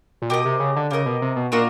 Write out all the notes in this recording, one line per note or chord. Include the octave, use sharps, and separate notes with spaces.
A#2
B2 G4 A#4 D#5
C3
C#3
D3
C#3 G4 A#4 D#5
B2
C3
B2
A#2 D4 F#4 A#4 D#5